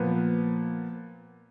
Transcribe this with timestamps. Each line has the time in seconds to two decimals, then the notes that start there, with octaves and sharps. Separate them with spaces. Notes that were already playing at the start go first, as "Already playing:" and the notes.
Already playing: A#2 F3 B3